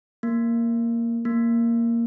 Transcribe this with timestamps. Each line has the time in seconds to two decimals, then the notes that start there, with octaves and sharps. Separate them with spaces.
0.23 A#3
1.25 A#3